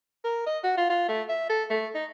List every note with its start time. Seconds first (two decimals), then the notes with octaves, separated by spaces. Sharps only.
0.24 A#4
0.47 D#5
0.64 F#4
0.77 F4
0.90 F4
1.09 A3
1.29 E5
1.50 A4
1.70 A3
1.95 D#4